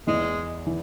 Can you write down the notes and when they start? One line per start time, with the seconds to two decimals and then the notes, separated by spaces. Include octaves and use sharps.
0.07 E2 E3 G#3
0.67 E3